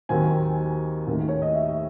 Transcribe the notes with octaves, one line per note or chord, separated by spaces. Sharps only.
D#2 D#3 F#3 C4 G#5
D#2 D#3 A3
C#5
D#5
E5